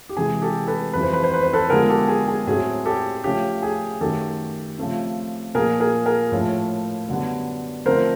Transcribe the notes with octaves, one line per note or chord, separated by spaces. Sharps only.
G4
C3 E3 G#3 G#4
G4 A4
A4 B4
F2 C#3 E3 G3 B4
C5
B4
C5
B4
C5
A4 B4
D3 F3 G#3 B3 G#4 A#4
G4 A4
G#4
G#4
A2 F#3 A3 C4 G#4
G4 A4
C#3 F3 A3 C#4 G4
G#4
F#2 D#3 F#3 A3 G4 A4
C#3 F3 A3 C4
A#2 F3 A#3 G#4 A#4
G#4 A#4
G#4 A#4
A2 F3 A3 C#4
F#2 D3 G3 B3
D3 F3 A3 C4 A#4 C5